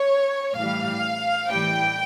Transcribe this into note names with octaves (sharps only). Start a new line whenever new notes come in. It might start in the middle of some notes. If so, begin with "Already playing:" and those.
Already playing: C#5
A2 E3 G3 F5
A2 E3 G3 G5